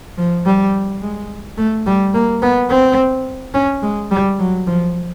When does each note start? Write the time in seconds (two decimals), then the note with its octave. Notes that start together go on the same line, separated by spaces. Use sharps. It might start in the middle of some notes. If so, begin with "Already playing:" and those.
0.17 F3
0.45 G3
1.01 G#3
1.58 A3
1.86 G3
2.14 A#3
2.42 B3
2.70 C4
3.54 C#4
3.83 G#3
4.11 G3
4.39 F#3
4.67 F3